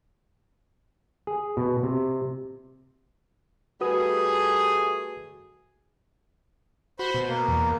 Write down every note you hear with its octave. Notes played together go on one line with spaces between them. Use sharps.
G#4
B2
C3
G3 A3 F#4 G#4 B4 D#6
F#4 C5 B5 C6
B2
A#3
E2